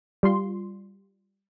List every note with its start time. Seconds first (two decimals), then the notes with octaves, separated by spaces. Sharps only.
0.23 G3 F4 C6